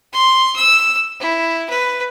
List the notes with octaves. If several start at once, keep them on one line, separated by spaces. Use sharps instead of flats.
C6
E6
E4
B4